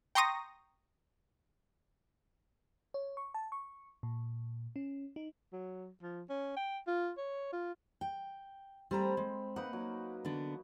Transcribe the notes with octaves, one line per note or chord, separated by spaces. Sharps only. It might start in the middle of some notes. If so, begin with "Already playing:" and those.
G5 A#5 C6 C#6 D#6 A#6
C#5
C#6
A5
C#6
A#2
C#4
D#4
F#3
F3
C#4
G5
F4
C#5
F4
G5
G3 A3 C4 A#5 B5
G#3
A#3 D#4 B4 F#5
F#3
D3 B3 D4